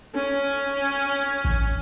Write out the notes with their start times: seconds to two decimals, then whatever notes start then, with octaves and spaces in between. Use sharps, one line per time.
0.15 C#4
1.45 A1